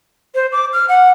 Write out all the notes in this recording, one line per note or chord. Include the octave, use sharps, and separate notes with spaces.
C5
D6
F6
F#5